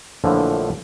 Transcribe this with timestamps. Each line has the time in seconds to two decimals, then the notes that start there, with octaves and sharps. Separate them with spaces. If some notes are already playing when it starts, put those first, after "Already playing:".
0.24 A#1 A2 D3 E3 F3